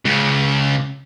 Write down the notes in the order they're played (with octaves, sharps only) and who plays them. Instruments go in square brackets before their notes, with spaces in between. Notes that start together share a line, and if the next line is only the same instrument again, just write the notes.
[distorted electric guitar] C#2 C#3